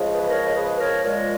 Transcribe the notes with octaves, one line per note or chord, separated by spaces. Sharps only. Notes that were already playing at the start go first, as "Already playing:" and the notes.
Already playing: C#3 F3 G#3
G#4 B4
A#4 C#5
C#5
G#4 B4
A#4 C#5
A#2 F3 G#3 A#4 C#5